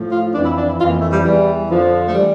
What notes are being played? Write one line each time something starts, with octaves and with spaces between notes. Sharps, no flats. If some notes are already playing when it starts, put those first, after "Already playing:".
Already playing: A2 F3
F4
F2 E3 D4
E4
D4
E4
F2 E3 F4
A#3
A3
G3
E2 E3 G3
F2 D3 F3
A3
E3 G3